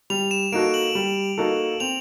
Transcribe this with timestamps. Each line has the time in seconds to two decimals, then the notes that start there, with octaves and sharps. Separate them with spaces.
0.10 G3 F7
0.31 E7
0.52 A#3 D#4 F#4 A4 D7
0.74 F#7
0.95 G3
1.38 A#3 D#4 F#4 A4
1.80 C4 F7